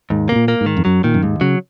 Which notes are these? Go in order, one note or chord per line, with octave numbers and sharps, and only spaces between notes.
D#2 G#2
B2 A#3
A#2
A#3
G#2
D#3
F2
F#2 F#3
A#2 D#3
F#2
D#2 G#2
C#3 F#3